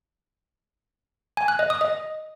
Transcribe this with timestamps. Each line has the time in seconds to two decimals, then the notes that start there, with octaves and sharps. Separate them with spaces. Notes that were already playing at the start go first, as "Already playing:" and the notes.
1.37 G#5
1.48 F#6
1.59 D#5
1.70 D#6
1.81 D#5